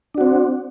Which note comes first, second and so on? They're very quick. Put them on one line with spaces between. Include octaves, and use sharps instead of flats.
D4 F#4 C4